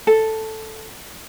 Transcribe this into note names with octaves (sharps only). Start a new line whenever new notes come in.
A4